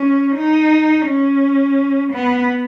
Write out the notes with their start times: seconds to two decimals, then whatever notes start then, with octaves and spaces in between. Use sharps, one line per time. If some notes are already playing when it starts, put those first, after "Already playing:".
Already playing: C#4
0.37 D#4
1.07 C#4
2.12 B3